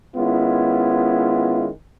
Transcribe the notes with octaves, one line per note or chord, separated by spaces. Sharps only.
D#3 G#3 B3 C#4 E4 F4